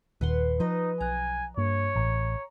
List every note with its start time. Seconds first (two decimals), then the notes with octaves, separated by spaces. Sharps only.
0.21 D#1 D#2 B4 F#5 C6
0.60 F3 D#4 B4 D#5
1.01 B1 G#5 A#5 F#6
1.57 G2 A#3 C#5
1.96 A1 A#5